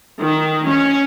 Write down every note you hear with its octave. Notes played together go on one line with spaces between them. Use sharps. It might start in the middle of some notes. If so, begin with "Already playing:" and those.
D#3
C#4